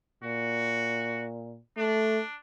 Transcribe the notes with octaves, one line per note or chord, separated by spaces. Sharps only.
A#2 F#4
A3 D4